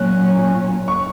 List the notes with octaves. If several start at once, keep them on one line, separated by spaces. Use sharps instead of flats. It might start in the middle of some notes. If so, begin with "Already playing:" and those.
Already playing: A#2 F#3 C#4 F#6
C#6